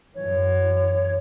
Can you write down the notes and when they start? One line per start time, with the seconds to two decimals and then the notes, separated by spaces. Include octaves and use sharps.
0.15 F#2 E3 C#5